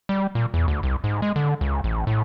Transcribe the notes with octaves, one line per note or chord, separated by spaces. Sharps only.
G3
A#2
E2
D2
C2
G#2
G#3
D3
C#2
A1
A2